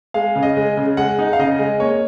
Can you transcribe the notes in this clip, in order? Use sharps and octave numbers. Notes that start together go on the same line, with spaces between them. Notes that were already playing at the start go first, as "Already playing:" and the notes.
G#3 F5
C#3
D#5
G#3
C#3
G#3 F#5
D#4
F5
C#3 D#5
G#3
A#3 C#5